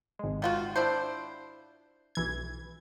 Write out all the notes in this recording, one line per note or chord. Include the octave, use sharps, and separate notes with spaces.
G#1 G#3
D#3 F4 F#4
D4 E4 C5
B1 E3 G#6